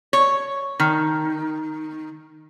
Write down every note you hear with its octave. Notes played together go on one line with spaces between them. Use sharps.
C#5
D#3